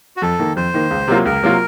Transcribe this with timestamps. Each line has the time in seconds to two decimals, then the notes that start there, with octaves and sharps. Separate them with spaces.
0.17 F#4
0.22 F2 A4
0.39 D#3 A#3
0.56 F2 C5
0.74 D#3 A#3
0.91 C#2
1.08 C3 F#3 A#3 F4
1.25 C#2 A#4
1.43 C3 F#3 A#3 F4